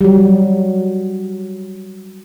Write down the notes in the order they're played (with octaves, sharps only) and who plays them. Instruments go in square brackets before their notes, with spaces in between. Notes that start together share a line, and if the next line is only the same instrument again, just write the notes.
[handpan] F#3 G3